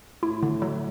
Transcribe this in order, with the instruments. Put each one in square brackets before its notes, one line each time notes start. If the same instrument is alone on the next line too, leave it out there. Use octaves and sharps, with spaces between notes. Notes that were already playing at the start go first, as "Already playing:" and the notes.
[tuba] A2 [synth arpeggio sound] E4
[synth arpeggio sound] D3
F#3